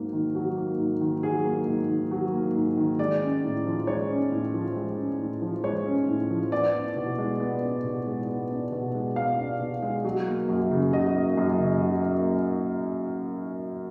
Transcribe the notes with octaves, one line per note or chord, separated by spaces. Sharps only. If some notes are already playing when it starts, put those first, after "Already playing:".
Already playing: G#2 F#3 A#3
D#3
F#3
A#3
G#2
D#3
F#3 G#4
A#3
G#2
D#3
F#3
A#3
G#2
D#3
G#3 D5
C#4
A2
F3
G#3 C#5
C#4
A2
F3
G#3
C#4
A2
F3
G#3 C#5
C#4
A2
F3
B3 D5
D4
B2
G#3
B3
D4
B2
G#3
B3
D4
B2
G#3
B3 F5
D4
B2
G#3
F#3
A#3
F#2
C#3
F#3 D#5
A#3
F#2
C#3
F#3
A#3